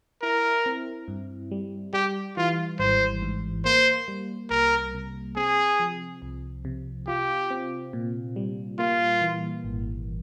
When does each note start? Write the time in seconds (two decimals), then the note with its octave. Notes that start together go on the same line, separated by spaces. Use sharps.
0.22 E4 A#4
0.66 C4
1.08 G2
1.51 G3
1.93 G3 G4
2.37 E3 F4
2.79 G#1 C5
3.22 G#2
3.65 A#3 C5
4.08 G3
4.50 C2 A#4
4.94 C3
5.36 C4 G#4
5.80 F3
6.22 C2
6.65 C3
7.07 F4 G4
7.50 C4
7.93 A#2
8.36 G3
8.79 A#3 F4
9.22 E3
9.64 G#1